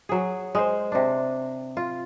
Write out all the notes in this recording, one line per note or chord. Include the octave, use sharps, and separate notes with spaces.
F#3 G#4
G#3 C5
C3 D4
F4